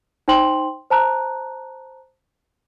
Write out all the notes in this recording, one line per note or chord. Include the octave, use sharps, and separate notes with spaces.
D#4 C5 G5 C6 F#7
C5 A5 A#5 F#6